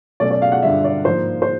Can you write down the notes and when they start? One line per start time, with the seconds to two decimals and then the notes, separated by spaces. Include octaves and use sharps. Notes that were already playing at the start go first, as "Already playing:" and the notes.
0.20 B2 F#3 A3 C#4 D5
0.31 D5
0.42 F5
0.52 F#5
0.63 G2 D3 G3 E5
0.84 D5
1.05 G#2 F3 A#3 C5
1.42 C5